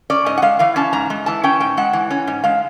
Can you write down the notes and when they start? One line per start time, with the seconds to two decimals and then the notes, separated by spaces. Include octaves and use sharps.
0.10 C#4 D5
0.26 G#2 D#5
0.38 F#5
0.42 G#3 F5
0.59 E3 F5
0.76 C#4 A5
0.93 G#2 A#5
1.10 G#3
1.26 E3 A5
1.44 C#4 G5
1.60 G#2 G5
1.77 G#3 F#5
1.93 E3
2.11 C#4
2.27 G#2
2.44 G#3 F5